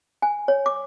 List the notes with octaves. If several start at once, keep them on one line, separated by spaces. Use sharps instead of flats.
G#5
C#5
D6